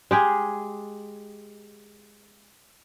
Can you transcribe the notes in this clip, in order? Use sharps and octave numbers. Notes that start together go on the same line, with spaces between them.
G#3 G4 G#4